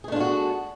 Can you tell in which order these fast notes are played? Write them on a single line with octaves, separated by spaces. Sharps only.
G#4 A3 D4 F4 F#4